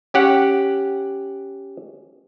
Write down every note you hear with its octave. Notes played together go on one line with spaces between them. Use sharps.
C#4 G4 F#5